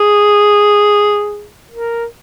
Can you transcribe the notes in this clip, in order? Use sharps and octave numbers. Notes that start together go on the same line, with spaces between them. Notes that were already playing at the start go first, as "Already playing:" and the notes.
Already playing: G#4
A#4